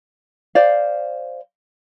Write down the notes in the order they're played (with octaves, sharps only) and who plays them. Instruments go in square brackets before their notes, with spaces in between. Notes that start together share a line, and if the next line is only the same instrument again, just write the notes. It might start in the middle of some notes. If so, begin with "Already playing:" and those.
[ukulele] C5 D5 F5